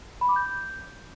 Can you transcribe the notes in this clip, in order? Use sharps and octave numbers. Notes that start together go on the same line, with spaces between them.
B5
D6
G6